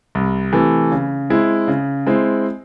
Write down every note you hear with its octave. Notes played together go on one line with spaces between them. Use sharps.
C2
C3 E3 A3
C#3
G#3 C4 E4
C#3
G#3 C4 E4